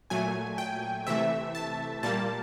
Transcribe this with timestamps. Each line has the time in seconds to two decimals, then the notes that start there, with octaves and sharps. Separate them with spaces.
0.10 A#2 F#3 A3 G#5
0.58 G5
1.07 C3 E3 A3 E5
1.55 A5
2.03 A#2 G3 A#3 A5